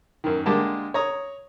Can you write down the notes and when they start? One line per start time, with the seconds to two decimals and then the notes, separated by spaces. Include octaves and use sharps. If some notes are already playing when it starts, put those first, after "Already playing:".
0.24 F#2 D#3
0.46 D3 G#3 A#3 G4 A5
0.94 C#5 A#5 D#6